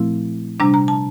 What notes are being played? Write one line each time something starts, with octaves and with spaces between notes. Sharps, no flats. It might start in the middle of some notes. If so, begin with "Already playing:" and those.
Already playing: A#2 F3 A3 C4 E4
C3 G3 D4 A#5
A#5
A5